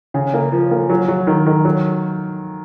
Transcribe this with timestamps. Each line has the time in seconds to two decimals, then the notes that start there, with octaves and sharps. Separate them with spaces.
0.14 C#3
0.34 A#3
0.52 F3
0.71 A#3
0.90 F#3
1.08 F#3
1.27 D#3
1.46 D#3
1.65 F#3